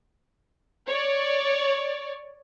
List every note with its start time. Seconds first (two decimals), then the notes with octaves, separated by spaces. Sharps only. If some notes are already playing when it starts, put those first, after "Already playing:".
0.87 C#5 D5